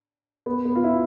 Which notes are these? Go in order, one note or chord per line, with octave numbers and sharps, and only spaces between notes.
B3
B3
F4
E4